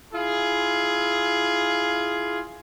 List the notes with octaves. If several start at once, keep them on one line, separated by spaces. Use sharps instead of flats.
E4 F4 G#4